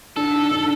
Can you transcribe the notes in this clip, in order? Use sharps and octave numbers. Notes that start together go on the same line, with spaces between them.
D4 A4
D#4
D4